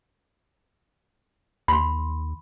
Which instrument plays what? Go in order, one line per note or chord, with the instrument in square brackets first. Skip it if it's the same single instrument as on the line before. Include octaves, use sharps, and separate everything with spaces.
[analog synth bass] D#2 [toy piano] B5 C6